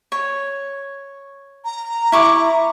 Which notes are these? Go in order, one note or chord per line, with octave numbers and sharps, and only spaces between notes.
C#5
A#5
E4 C#6 D6